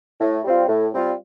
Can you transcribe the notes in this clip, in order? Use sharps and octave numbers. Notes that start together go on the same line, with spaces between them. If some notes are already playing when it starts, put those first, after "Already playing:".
A2
G3 C4 F4
A2
G3 C4 F4